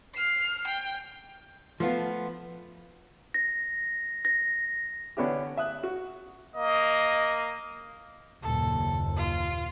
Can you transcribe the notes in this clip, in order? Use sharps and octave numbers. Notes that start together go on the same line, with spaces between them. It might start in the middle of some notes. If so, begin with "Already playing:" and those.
F6 C7
G5
F3 A3 B3 F4
A#6
A#6
D3 B3 C#4 D4 E4 G4
E5 D#6 F#6
F#4
A#3 D#5
F#1 D#2 A#2 A4
F4